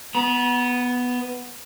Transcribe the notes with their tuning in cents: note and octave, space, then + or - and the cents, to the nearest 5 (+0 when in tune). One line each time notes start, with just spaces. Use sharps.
B3 +0 B5 -45